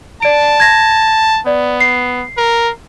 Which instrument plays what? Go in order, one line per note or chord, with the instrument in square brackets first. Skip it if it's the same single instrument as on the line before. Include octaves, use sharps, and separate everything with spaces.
[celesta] D5 D7 [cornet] A5
[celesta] G#6 A#6
[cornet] B3 [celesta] D5
[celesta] C7
[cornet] A#4